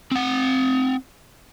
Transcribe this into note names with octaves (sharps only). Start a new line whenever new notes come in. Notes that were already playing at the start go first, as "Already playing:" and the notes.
C4 F#5